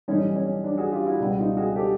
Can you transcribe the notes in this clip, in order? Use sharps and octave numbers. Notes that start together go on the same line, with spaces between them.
B1 A2 E3 G3 C#4 D#4
C#4
D4
F#4 G#4
F4 G4
E4 F#4
C#2 B2 G3
F#4
D#4 F4
F#4 G#4
G4 A4